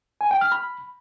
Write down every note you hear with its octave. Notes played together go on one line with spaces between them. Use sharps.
G#5
G5
F6
B5